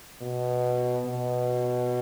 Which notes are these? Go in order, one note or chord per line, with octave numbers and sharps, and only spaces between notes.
B2
B2